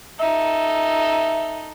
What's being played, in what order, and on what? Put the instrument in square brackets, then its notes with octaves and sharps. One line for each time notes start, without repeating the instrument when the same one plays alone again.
[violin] D#4 A4 [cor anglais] E5